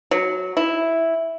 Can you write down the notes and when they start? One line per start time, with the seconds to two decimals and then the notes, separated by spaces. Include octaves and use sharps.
0.11 F#3
0.57 E4